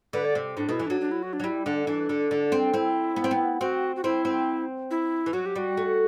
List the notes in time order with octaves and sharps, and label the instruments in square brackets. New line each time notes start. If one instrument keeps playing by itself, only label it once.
[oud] D3 [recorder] B4
[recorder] D5
[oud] C3
[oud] A2 [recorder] D4
[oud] B2 [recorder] E4
[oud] E3
[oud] F#3 [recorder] D4
[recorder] D4
E4
F#4
D4
[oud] F#3
[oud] G3 [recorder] E4
[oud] D3 [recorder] D4
[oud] E3 [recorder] D4
[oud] D3
D3
C4
[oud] C4 [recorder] E4
[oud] B3
C4
B3
[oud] C4 [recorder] F#4
[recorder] F#4
[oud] C4 [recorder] E4
[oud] C4
[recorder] E4
[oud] E3
[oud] F#3 [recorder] F#4
[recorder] G4
[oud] G3 [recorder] F#4
[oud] A3